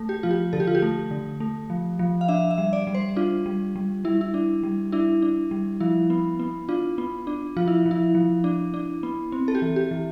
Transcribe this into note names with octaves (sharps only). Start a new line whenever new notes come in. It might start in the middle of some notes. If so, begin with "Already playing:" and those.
Already playing: A3
G4
F3 F4
G4
D3 A4
G4
F4
G4
A3
D3
A3
F3
F3
F5
D4 E5
E5
G3
D5
G3
C5
D4 F4
G3
G3
G3 E4
E4
D4
G3
D4 E4
D4
G3
F3 E4
B3
B3
D4 F4
B3
D4
F3 F4
E4
F3
E4
F3
D4
D4
B3
C4
A4
G4
E3
G4
E3